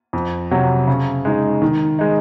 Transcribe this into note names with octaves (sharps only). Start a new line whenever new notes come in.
F2
C3 F#3
C#3
G#3 D#4
D#3
G#3 D#4